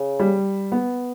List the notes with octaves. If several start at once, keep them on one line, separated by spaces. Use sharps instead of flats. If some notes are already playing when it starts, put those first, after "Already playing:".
Already playing: C#3
G3
B3